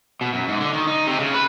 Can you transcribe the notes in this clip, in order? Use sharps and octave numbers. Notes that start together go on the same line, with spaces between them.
B2
F#2
G#2
D3
D#3
D#4
C3
C#3
B4